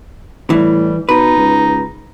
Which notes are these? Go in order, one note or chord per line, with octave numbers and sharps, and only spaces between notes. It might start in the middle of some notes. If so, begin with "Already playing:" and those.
A2 E3 G3
B2 D#4 B4
C#2